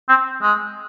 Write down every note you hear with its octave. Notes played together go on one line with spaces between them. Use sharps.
C4
G#3